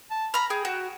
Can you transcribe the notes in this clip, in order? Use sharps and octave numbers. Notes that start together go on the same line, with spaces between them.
A5
A#5 B5 F6
G#4 G5
F#4